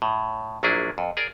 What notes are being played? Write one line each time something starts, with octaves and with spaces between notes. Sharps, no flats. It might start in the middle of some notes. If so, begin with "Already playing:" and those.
A2
A#1 F#3 A#3 D4 E4 G#4
F2
G#4 A#4 D5